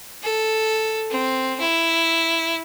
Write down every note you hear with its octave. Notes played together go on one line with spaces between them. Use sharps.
A4
C4
E4